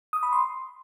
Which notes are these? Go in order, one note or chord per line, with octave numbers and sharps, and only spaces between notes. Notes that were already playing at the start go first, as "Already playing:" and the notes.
D#6
B5
C6